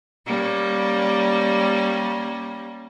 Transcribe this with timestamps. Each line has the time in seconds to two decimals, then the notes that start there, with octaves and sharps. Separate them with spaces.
0.26 G3 A#3 C#4